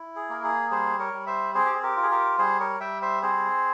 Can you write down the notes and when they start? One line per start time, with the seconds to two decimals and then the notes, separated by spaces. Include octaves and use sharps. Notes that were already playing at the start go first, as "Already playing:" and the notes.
Already playing: E4
0.16 G#4
0.29 A#3 A#4
0.44 G#4
0.71 G3 G#4 C5
0.99 A#4 C#5
1.13 G3
1.26 C5 E5
1.55 C4 G#4 C5
1.66 G4
1.74 G#4
1.83 G4 A#4
1.97 F4
2.03 G#4
2.11 G4 A#4
2.38 G3 G#4 C5
2.60 A#4 C#5
2.80 G3 E5 G5
3.02 C5 E5
3.22 C4 G#4 C5